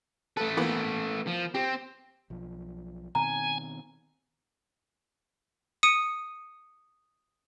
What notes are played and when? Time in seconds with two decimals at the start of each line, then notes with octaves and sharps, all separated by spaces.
0.37 A3 A4 B4
0.57 E3 A#3 B3
1.27 F3
1.55 C4 G4
2.30 B1 F3
3.15 B2 D#3 C4 G#5 A#5
5.83 D#6 C#7 D#7